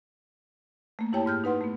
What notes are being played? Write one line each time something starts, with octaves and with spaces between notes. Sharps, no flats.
A3 A#3
F#2 E4 G4 C#5 G5 A5
G#2 F6 G6
D#4 B4 F#5 C6
A3 B3